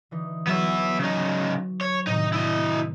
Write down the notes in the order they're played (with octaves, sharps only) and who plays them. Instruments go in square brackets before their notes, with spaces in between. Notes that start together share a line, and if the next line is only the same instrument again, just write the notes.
[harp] D3 E3 D#4
[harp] F#3 C#5 [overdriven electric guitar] B3 E5
[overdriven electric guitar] C#3 D#4
C#5
[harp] A2 C3 D#3 [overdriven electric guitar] D#4
[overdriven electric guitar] E4 D#5